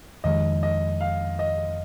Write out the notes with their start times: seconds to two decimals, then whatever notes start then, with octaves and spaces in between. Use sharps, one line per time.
0.24 F2 D#3 G#3 D#5
0.63 D#5
1.01 F5
1.39 D#5